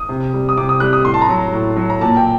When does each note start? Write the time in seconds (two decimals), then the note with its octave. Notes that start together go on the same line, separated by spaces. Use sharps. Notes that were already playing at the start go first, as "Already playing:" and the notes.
Already playing: D#6
0.09 C3
0.33 G3
0.49 D#6
0.57 C3 D6
0.69 D#6
0.80 G3 F#6
0.93 D#6
1.04 A2 C6
1.14 A5
1.22 A#5
1.29 F#3
1.53 A2
1.76 F#3
1.90 A#5
2.01 A#2 A5
2.17 G5